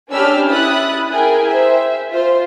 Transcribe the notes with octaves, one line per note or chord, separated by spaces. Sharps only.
C#4 D4 G4 B5 E6 F6
E4 B5 D#6 F#6 A6
E4 G#4 A#4 G5 G#5
C5 E5
F4 C5